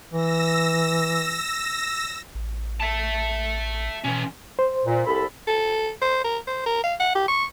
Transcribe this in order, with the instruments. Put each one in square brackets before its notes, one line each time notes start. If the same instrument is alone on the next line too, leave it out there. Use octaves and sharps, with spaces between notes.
[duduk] E3 [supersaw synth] E6 A#6
[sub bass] A1
[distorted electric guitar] E5 A5
[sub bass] B2 [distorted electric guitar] E3 C#4
[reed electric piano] C5
[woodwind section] A#2
C2 A4 B5
[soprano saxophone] A4
C5
A#4
C5
A#4
F5
F#5
G4
C#6